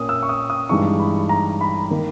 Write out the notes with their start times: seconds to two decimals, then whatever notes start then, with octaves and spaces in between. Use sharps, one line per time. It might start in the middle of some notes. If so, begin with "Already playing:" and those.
Already playing: A#2 A#3 C#4 D#6
0.09 E6
0.23 C#6
0.29 D#6
0.50 D#6
0.69 G2 E3 G#3 D#4 C#6
0.99 B5
1.29 A#5
1.61 B5
1.90 D#3 A#3 D#4